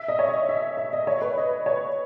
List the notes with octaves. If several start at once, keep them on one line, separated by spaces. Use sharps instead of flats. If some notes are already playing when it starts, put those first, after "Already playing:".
Already playing: E5
D#5
C#5
D#5
E5
E5
D#5
C#5
B4
D#5
C#5